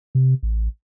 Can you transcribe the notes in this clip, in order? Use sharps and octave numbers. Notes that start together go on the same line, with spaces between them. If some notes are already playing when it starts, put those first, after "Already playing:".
C3
A1